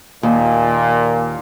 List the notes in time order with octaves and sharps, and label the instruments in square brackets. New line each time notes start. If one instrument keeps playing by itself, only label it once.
[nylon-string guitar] D#2 [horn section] A#2